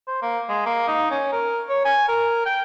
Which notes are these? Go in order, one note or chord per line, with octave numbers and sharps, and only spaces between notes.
C5
A#3
G#3
A#3
D#4
C#4
A#4
C#5
G#5
A#4
G5